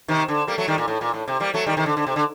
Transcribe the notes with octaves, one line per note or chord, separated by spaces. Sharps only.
C3 D#3
D3
G3 A#3
F#3 A3
D#3 G3
A#2
A2
A#2
A2
C3
G3 A#3
F#3 A3
D#3 G3
C3 D#3
D3
D3
C3
D3